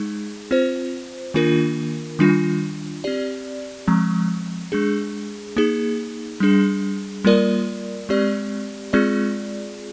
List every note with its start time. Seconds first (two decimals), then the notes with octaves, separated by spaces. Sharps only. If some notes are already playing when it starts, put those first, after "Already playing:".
Already playing: G#3 D#4 G#4
0.51 C4 F4 C5
1.34 D#3 A#3 D4 F4 A#4
2.19 D#3 G3 D4 F4
3.04 C4 G4 D5
3.88 F3 G#3 C4
4.72 G#3 D4 G#4
5.57 A#3 D#4 G#4
6.40 G3 D4 G#4
7.25 G3 A#3 F4 A#4 D5
8.09 G#3 C4 G4 D5
8.93 G#3 C4 F4 G#4 D5